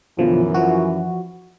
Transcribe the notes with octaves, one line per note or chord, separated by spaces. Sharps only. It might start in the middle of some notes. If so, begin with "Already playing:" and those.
F#2 B2 D3 E3 F3
F3 F#4